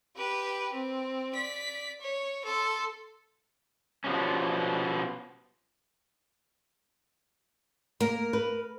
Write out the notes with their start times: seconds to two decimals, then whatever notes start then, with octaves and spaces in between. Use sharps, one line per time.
0.16 G4 B4
0.73 C4
1.31 D5 B6
2.00 C#5
2.45 A4 C6
4.04 B2 F3 G3 C#4
8.01 A#3 A#4
8.33 B4